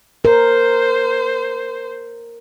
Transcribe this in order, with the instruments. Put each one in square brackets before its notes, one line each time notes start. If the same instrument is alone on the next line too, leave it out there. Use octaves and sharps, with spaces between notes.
[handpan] A#4 [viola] C5